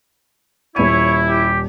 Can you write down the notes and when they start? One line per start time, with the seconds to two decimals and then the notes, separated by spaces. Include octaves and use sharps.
0.76 D#1 E4 C#5 D#7
1.29 G4